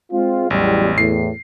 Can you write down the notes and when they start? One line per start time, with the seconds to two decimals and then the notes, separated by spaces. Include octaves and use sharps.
0.12 G#3 C4 F4
0.50 A1 E2 F#3 G3
0.98 E2 A2 C7